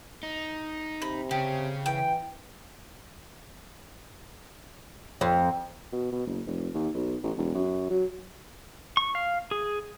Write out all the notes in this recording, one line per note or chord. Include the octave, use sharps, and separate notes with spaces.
D#4
C3 B5
C#3 C#4 G4
E3 G5
F2
B2
B2
F#1
F1
D#2
B1
A1
E1
F#2
F#3
C#6
F5
G#4